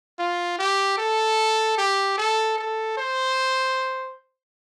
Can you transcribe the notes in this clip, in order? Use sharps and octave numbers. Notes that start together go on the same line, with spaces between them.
F4
G4
A4
G4
A4
A4
C5